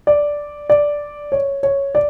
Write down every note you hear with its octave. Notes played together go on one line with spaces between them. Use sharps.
D5
D5
C#5
C#5
D5